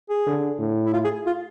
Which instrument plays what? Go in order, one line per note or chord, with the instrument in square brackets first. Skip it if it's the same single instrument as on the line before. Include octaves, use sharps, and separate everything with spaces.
[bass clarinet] G#4
[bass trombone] D3
A2
[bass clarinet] E4
F4
G#4
F4